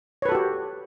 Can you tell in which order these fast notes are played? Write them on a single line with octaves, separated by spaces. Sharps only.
C#5 B4 A4 F#4 G4